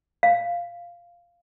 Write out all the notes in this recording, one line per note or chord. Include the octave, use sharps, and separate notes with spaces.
F5